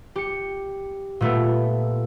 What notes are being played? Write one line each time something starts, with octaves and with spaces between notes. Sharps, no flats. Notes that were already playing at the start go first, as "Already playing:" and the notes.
G4 C#7
A#2 A3 B3